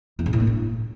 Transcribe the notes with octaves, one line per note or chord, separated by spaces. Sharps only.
E2
G#2
A2
A#3
G2